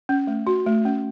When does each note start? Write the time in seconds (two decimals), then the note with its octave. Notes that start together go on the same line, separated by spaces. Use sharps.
0.09 C#4
0.27 A3
0.47 F#4
0.66 A3
0.85 C#4